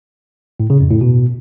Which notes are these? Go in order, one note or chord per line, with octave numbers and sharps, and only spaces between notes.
A2
C#3
F2
A2
B2